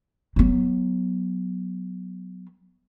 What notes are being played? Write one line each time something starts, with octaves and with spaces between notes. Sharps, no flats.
F#3 B3